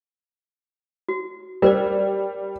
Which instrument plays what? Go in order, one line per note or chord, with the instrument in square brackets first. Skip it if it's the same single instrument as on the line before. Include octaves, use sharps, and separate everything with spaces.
[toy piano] F#4
[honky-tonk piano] G3 [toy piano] A#4 C5 D5